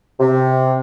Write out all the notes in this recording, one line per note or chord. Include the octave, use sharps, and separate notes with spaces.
C3